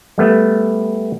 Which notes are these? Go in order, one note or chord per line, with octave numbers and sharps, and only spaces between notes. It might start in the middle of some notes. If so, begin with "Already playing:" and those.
G3 A3 B3